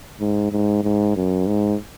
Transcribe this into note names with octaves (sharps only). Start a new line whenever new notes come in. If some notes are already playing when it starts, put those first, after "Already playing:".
G#2
G#2
G#2
F#2
G#2